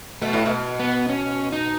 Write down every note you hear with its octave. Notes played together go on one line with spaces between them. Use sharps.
B2 A3
A2
B2
B3
C#4
D#4